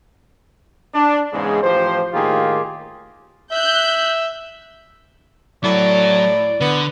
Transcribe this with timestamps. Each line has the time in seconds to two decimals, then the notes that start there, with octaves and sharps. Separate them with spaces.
0.94 D4
1.33 E2 G#2 C#3 G#3
1.63 A1 F3 G4 C5
2.13 A2 D#3 A#3 F4 G4 G#4
3.52 E5 F#6 G6
5.64 A2 F#3 D5
6.61 D3 B3